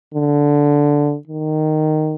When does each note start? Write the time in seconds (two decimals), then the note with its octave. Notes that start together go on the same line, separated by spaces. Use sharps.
0.14 D3
1.27 D#3